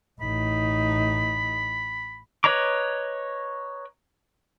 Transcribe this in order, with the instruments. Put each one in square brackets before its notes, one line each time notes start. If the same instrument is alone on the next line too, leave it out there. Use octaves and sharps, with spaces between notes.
[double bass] A1 D#4 [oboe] B5
[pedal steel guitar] B4 C#5 D#5 A#5 D6